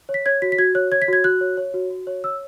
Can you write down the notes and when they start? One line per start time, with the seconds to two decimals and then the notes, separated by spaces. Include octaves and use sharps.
0.09 C#5
0.14 B6
0.26 C#5 G#6
0.42 F#4 B6
0.52 B6
0.58 F#4 G#6
0.75 C#5 F#6
0.92 C#5 G#6
1.02 B6
1.08 F#4 G#6
1.24 F#4 F#6
1.41 C#5
1.57 C#5
1.74 F#4
1.90 F#4
2.07 C#5
2.24 C#5 E6